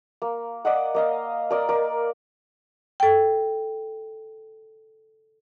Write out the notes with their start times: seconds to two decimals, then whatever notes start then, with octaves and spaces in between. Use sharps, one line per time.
0.22 A#3
0.65 D5 D#5 F#5
0.94 A#3 D#5 F5
1.50 A#4 D5 D#5
1.69 A#4 D5
3.00 A4 G5